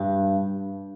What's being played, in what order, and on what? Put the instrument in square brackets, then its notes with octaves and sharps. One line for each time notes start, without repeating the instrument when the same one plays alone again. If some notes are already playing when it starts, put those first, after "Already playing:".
Already playing: [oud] G2